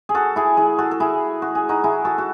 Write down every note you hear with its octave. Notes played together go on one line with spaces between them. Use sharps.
G#4
F#4 A4
E4 G#4
E4 G#4
F#4 A4
A4
E4 G#4
F#4
G#4
D#4 F#4
E4 G#4
F#4 A4
F#4